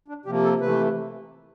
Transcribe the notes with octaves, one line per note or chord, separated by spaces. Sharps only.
D4
C3 F3 A#3 G4
A4
C3 E3 A3 B4